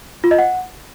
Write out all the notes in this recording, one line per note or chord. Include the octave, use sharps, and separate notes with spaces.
F4
D#5
F#5